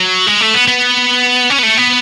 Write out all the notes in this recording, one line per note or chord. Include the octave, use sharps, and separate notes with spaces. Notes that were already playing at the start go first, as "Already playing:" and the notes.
Already playing: F#3
G#3
A3
B3
B3
C#4
B3
A3
B3